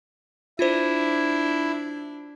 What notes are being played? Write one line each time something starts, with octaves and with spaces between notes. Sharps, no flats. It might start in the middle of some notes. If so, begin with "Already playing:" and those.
D4 E4 F4 C5